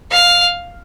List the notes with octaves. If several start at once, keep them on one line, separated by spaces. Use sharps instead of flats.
F5